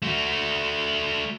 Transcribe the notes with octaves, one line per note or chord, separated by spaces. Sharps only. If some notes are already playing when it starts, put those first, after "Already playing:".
A3 F#4